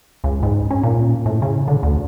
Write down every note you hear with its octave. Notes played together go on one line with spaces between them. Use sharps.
C#2
G#2
C#4
A#2
A2
C#3
D3
D2